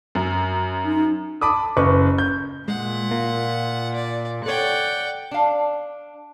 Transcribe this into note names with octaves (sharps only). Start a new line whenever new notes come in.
F#2
D#4
A5 B5 D6 D#6
F#1 B4 C#6
G6
A#2 G#3 F#5
A#3 F4
D5
A4 C#5 D5 F#5 G5
D4 F5